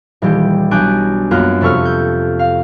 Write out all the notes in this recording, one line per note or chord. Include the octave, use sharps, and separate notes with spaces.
D#1 E3 G3 G4
B1 D4 G#5 D6 F#6 G6
F#2 A#3 B3 F4 F#6
F2 C3 A4 C#6 F6
G6
F5